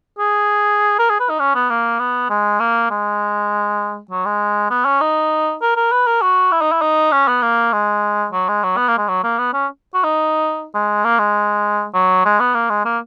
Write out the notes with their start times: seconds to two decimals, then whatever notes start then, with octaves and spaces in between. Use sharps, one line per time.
0.19 G#4
0.99 A#4
1.10 G#4
1.20 B4
1.30 D#4
1.39 C#4
1.55 B3
1.70 A#3
1.99 B3
2.30 G#3
2.60 A#3
2.91 G#3
4.11 F#3
4.25 G#3
4.70 B3
4.86 C#4
5.01 D#4
5.62 A#4
5.76 A#4
5.92 B4
6.07 A#4
6.22 F#4
6.52 E4
6.61 D#4
6.72 E4
6.81 D#4
7.12 C#4
7.28 B3
7.42 A#3
7.73 G#3
8.32 F#3
8.48 G#3
8.63 F#3
8.77 B3
8.88 A#3
8.97 G#3
9.08 F#3
9.24 A#3
9.38 B3
9.53 C#4
9.94 F#4
10.04 D#4
10.74 G#3
11.04 A#3
11.19 G#3
11.94 F#3
12.25 G#3
12.40 B3
12.54 A#3
12.70 G#3
12.85 A#3